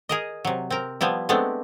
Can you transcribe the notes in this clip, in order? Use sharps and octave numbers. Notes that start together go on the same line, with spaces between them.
G#4 A#4 D#5
C3 F#3
C4 A#4
F3 G3 B3 E4
G#3 A3 B3 C4 D4